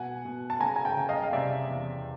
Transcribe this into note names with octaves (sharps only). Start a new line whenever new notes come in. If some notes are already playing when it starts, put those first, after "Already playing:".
Already playing: B2 F#5 G#5
B2
A5
C#3 G#5 A#5
G#5
G5 A5
C#3
D#5 F5
F5
C3 D5 E5
E2